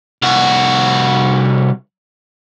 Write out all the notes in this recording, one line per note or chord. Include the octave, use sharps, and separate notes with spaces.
C2 F#4